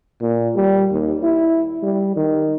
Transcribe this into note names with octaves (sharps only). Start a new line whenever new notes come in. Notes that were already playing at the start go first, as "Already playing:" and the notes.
A#2
G3
D#2
E4
G3
D#3